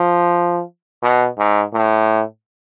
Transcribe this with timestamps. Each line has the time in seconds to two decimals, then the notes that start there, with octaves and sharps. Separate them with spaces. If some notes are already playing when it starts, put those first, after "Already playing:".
Already playing: F3
1.03 B2
1.38 G#2
1.73 A2